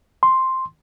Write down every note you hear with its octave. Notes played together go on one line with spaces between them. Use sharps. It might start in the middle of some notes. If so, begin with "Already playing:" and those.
C6